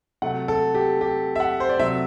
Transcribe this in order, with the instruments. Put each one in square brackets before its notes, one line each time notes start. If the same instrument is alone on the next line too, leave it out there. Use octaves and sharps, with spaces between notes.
[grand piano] C3 F#3 A3 F#5
A4
G4
G4
E5
F#5
C5
D5
C3 F#3 A3 E5